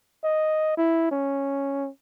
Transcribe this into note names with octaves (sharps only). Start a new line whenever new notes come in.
D#5
E4
C#4